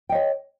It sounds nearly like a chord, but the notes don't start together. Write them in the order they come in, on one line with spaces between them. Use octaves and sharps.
G5 D#5 C#5